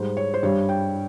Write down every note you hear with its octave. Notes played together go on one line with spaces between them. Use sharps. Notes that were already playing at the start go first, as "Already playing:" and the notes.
Already playing: G#2 G3 C5
C#5
C5
G2 G3 C#5
G5